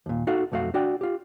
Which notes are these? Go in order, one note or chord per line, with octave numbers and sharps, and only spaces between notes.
D#2 A#2
D#4 F#4 A4 F5
B1 F2 A3 F#4 F5
D4 F#4 D5 G5
F4 G4